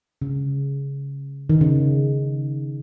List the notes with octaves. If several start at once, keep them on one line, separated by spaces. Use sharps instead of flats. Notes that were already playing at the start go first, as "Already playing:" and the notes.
C#3
D#3
C#3